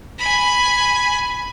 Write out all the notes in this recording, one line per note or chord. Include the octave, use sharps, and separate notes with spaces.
G#5 B5